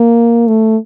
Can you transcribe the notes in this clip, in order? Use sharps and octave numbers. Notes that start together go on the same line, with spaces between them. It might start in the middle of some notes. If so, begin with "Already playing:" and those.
Already playing: A#3
A3